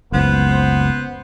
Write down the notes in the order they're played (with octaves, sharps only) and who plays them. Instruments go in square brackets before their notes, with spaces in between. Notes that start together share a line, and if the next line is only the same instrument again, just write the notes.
[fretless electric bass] F#1 C#2 [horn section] B3 C5